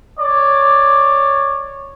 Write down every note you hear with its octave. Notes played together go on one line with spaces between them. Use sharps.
C#5 D5